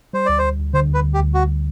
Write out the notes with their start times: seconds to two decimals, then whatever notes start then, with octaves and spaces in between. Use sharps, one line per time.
0.13 G3 C5
0.26 D2 D5
0.39 D2 C5
0.59 D2
0.73 D3 C5
0.90 D2 B4
1.04 D2
1.14 G4
1.19 D2
1.34 D2 F#4